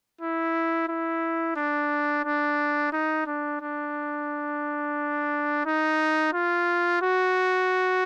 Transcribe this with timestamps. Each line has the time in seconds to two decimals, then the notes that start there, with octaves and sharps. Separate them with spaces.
0.21 E4
0.88 E4
1.56 D4
2.24 D4
2.92 D#4
3.26 D4
3.61 D4
5.66 D#4
6.33 F4
7.02 F#4